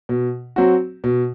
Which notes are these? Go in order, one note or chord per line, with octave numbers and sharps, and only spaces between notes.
B2
F#3 C4 F#4
B2